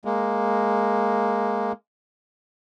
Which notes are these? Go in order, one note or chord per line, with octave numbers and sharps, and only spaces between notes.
G#3 A#3